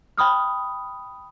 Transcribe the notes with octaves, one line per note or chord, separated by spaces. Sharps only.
G5 B5 D#6 F6